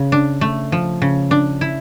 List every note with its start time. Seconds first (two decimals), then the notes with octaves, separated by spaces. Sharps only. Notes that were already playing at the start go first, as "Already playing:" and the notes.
Already playing: C#3
0.12 D4
0.41 A3
0.72 F3
1.02 C#3
1.31 D4
1.61 E4